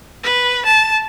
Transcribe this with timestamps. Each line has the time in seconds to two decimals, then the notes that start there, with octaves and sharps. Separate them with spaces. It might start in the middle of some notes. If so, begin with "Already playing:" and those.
0.23 B4
0.66 A5